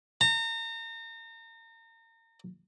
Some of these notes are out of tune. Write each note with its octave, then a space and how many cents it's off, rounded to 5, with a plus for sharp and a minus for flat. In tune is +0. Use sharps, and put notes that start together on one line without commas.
A#5 -35